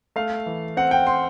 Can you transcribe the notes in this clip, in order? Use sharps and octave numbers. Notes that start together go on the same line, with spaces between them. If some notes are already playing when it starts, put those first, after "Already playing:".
A3 F5
E3
C4 F#5
G5
C6